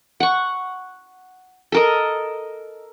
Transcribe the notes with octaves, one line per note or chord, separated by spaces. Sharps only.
F#5 C#6
A4 A#4 D#5